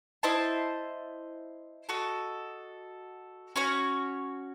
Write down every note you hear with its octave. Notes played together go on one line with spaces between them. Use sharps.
E4 C5 D#5 A5
F#4 A4 D#5
C#4 F#4 C#5